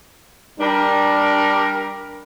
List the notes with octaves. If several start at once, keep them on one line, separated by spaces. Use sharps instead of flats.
G3 D4 A#4